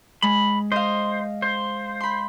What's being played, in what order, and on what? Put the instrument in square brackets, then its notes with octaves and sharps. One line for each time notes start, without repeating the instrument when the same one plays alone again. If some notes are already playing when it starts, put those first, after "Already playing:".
[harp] G#3 [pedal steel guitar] B5
[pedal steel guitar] C5 [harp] D#5 F5
[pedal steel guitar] C5
[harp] B5 C6